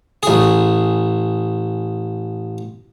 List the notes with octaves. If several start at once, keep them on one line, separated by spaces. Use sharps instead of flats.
A1 G#4